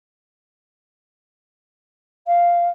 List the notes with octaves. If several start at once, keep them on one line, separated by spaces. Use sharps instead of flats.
F5